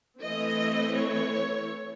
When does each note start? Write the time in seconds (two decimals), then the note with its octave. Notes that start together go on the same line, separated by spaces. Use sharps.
0.21 E3 A3 C4 D#5
0.95 C#5